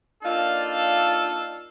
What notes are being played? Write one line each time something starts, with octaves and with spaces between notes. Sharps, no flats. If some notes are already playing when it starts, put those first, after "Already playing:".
A#3 D4 D#4 F4 A4